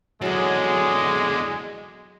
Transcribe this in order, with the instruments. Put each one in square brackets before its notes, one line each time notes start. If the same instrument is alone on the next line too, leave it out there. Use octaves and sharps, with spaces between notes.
[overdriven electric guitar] E2 D3 [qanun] F#3 D#4 [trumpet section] G#3